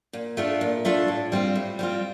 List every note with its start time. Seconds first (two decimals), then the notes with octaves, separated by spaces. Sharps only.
0.13 A#2
0.37 A3 D4 F4 A4
0.61 A#2
0.85 A3 D4 F4 A4
1.08 A2
1.32 G3 C4 F4
1.55 A2
1.79 G3 C4 F4